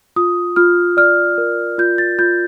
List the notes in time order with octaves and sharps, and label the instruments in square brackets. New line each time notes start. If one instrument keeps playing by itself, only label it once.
[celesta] F4 D#6
F4 F6
D5 F6
A#4
F4 G6
A6
F4 G6